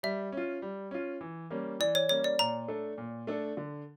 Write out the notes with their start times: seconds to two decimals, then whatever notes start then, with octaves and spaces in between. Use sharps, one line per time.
0.03 G3 E5
0.32 C#4 F4
0.62 G3
0.91 C#4 F4
1.21 E3
1.50 G3 A#3 C#4
1.80 E3 D5
1.95 C#5
2.09 G3 A#3 C#4 C#5
2.24 D5
2.39 A#2 A#5
2.68 A3 D4 A4
2.98 A#2
3.27 A3 D4 A4
3.57 D3